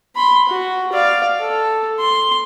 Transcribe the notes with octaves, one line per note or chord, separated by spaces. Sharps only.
B5 C6
F#4
D5 F5
A4
C6